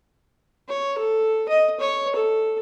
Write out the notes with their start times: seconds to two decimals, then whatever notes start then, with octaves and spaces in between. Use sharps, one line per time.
0.69 C#5
0.98 A4
1.49 D#5
1.80 C#5
2.16 A4